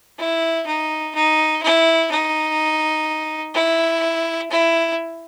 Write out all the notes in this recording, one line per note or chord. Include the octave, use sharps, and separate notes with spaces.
E4
D#4
D#4
E4
D#4
E4
E4